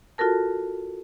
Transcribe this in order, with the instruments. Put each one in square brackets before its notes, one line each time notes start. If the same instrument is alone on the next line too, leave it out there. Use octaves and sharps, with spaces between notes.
[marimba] F4 F#4 A4 A#4 A5